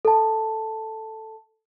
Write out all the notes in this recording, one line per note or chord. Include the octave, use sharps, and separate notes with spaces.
A4 A5